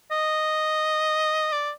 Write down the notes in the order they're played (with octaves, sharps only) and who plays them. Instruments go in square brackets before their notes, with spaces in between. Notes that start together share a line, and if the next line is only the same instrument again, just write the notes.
[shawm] D#5
D5